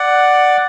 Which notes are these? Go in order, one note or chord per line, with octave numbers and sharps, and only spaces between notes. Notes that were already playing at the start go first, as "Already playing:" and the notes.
Already playing: D5 F#5